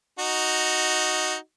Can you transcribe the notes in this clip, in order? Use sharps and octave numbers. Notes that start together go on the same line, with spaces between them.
D#4 F#4